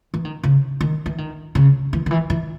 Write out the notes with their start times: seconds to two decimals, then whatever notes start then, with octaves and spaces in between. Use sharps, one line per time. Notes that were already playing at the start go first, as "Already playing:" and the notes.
0.14 E3
0.25 D#3
0.43 C#3
0.81 D#3
1.06 E3
1.18 D#3
1.55 C#3
1.93 E3
2.06 D#3
2.11 E3
2.30 E3